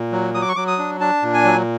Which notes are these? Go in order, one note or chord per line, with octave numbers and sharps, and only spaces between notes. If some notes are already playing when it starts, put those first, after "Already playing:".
Already playing: A#2
F#3
F#3 D#6
D6
C#6
F#3 D6
D#6
D4
D4 A5
A#2
G#5
F#3